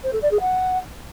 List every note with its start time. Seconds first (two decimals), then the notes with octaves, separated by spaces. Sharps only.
0.04 C5
0.13 A4
0.22 D5
0.31 G#4
0.40 F#5